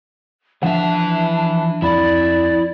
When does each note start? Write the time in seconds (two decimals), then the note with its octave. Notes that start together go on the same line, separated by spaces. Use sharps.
0.63 E3 F3 D4 E5 F#5
1.82 F2 E4 D5 B5